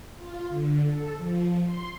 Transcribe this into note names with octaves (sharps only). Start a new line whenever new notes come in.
F4
D3
A4
F3
C6